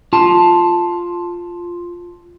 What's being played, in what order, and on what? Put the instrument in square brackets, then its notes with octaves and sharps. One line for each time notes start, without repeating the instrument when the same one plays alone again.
[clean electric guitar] F4 A5